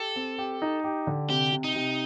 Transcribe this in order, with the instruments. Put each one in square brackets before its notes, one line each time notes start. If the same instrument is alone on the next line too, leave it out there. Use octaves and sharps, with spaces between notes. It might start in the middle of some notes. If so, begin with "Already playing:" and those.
Already playing: [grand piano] G4 [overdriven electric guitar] A4
[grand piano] C4
G4
D#4
G4
D3
[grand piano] C3 [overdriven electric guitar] G4
[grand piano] C3
[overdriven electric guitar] D#4
[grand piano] C3